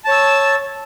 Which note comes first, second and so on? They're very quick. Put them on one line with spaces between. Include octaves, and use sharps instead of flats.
A5 C#5 E6